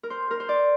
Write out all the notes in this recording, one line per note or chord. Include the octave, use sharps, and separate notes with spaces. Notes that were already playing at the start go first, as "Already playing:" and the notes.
A#4
C5
A#4
C5
D5